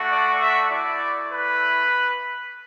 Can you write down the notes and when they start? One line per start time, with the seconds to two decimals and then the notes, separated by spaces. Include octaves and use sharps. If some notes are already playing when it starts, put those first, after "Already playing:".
Already playing: A3 D4 F#4
0.10 D5
0.40 E5
0.70 A3 E4 D5
1.31 B4